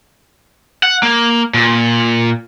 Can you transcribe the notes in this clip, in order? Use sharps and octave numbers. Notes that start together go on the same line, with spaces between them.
F#5
A#3
A#2